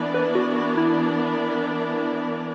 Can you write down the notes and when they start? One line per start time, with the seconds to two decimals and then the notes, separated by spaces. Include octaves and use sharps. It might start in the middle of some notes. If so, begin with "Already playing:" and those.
Already playing: E3 B3 D4 A#4 D5
0.14 B4
0.35 F#4
0.56 F#4
0.77 E4